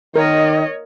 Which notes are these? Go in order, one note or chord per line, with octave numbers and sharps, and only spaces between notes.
D#3 A#4 C#5 D#5